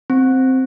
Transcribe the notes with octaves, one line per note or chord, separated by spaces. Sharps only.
C4